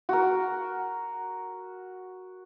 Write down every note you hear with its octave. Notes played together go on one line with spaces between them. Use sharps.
F#4 A#4